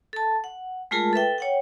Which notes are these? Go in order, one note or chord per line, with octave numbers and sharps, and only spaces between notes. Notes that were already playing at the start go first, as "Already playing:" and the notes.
A4 A5
F#5
G#3 A3 F4 G#4 A#4 A5
A4 B4 E5 G5
C#5 F#5 G5